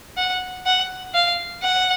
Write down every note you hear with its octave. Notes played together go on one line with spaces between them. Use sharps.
F#5
F#5
F5
F#5